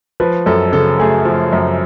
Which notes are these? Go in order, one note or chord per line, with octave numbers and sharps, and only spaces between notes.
F3 B4
F#2 A4
C#3 A4
A3 G#4
F3
F#2